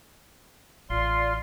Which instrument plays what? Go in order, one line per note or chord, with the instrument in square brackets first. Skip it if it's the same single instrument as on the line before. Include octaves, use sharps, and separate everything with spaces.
[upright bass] A1 [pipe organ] F4 C6 [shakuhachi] D5